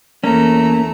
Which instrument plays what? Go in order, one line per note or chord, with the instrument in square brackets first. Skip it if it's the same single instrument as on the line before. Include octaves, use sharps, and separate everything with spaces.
[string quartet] E2 A3 A#5 [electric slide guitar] A#3 C#4